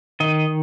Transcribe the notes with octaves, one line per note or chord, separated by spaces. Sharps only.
D#3 D#5